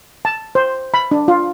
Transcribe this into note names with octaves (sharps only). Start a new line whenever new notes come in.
A5
C5
B5
D4
F4